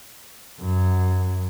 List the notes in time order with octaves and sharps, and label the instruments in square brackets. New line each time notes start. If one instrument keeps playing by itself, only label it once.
[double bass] F#2